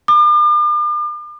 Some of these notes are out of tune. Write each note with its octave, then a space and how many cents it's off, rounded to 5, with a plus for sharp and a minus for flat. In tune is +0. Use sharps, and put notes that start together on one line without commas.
D6 +40